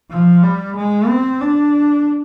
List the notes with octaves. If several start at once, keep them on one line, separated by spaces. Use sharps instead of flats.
F3
G3
G#3
C4
D4